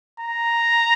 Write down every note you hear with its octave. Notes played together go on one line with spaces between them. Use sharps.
A#5